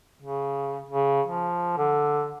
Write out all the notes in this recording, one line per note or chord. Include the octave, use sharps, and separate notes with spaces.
C#3
C#3
F3
D3